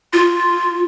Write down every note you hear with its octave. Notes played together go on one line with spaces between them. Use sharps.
F4